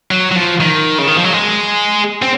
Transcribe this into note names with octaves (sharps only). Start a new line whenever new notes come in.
F#3
F#3
F3
D#3
C#3
D#3
F3
F#3
G#3
C4